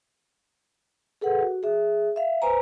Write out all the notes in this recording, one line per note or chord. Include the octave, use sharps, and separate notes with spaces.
G#4 A4 B4 F#5
F#4
G#4 E5
E5 F5
B4 C5 G#5 A#5